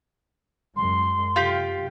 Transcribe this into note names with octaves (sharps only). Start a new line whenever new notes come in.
F#2 G#3 C6
F#2 C3 F4 G4